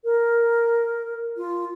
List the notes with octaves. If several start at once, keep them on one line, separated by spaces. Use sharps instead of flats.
A#4
F4